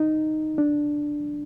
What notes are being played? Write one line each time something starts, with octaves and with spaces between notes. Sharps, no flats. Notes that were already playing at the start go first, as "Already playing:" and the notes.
Already playing: D#4
D4